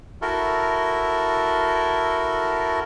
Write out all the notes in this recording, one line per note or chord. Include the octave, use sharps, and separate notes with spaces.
E4 F#4 A4 A#4